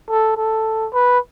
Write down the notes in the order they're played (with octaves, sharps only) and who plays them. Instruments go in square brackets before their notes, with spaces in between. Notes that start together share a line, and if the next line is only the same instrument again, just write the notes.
[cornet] A4
A4
B4